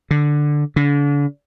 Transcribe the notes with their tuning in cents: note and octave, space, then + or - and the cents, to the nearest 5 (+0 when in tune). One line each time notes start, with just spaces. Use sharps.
D3 +5
D3 -35